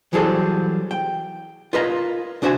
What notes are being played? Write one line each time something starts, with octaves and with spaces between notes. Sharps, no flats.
E3 F#3 G3 G#4 A4 C5
G5
F4 A#4 B4 D#5 F5 A#5
C2 D4 F#4 C5 E5 G#5